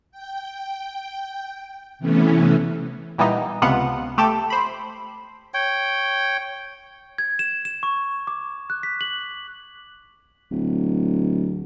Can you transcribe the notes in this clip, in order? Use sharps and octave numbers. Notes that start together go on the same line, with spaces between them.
G5
C3 E3 A3 B3 C#4
A#2 E3 G3 B3 D#4
C#2 C3 B3 F4 F#5
A3 G4 A4
C5 B5
C#5 G5
G#6
E7
E7
C#6
D6
F#6
B6
F#7
D1